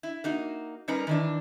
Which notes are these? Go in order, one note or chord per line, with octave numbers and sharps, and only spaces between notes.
E4
A#3 D#4 F#4
G3 C#4 D#4 A#4 B4
D#3 E3 D4